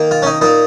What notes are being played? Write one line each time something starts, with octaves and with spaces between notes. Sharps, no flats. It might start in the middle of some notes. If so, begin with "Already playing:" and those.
Already playing: D#3 A#3
F4
C#4
D#4
A#2 A#3 D#4